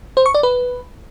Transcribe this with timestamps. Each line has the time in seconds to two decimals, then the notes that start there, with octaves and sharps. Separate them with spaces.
0.17 C5
0.26 C#6
0.34 D5
0.43 B4